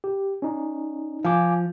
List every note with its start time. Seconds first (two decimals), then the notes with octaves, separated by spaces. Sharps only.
0.04 G4
0.42 C#4 D#4
1.25 F3 F5 G#5 D6